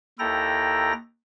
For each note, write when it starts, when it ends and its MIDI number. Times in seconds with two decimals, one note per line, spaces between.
0.19 0.93 39
0.19 0.93 64
0.19 0.93 69
0.19 0.93 79
0.19 0.93 82
0.19 0.93 94